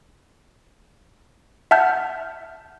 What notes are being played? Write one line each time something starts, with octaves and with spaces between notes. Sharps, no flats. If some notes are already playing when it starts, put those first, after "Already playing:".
E5 F#5 A5 F6 G6